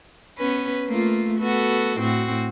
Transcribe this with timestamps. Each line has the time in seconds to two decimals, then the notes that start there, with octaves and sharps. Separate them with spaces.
0.38 B3 C#4 B4
0.86 A3 A#3 F4
1.39 B3 F#4 A4
1.99 A2 C4 F#4